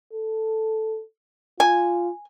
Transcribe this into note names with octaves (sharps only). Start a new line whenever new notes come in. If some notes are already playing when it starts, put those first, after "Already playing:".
A4
F4 G#5